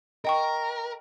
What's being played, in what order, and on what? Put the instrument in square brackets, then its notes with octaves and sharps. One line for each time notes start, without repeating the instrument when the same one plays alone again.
[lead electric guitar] A#4 [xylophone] D#5 G5 C#6